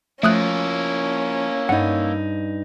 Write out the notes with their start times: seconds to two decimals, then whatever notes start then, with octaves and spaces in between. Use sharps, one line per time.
0.23 F3 A3 A#3 C#4 E4 D#6 F#6
1.69 G2 D#4 F#5